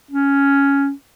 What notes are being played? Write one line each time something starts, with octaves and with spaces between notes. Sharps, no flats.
C#4